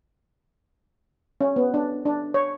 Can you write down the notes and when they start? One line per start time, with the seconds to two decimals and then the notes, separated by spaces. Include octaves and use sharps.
1.41 C#4
1.56 B3
1.74 D4
2.06 D4
2.34 C#5